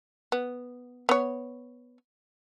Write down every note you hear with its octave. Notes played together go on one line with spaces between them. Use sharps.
B3
B3 C#5